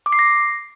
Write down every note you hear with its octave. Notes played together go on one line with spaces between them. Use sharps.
D6
C7
A#6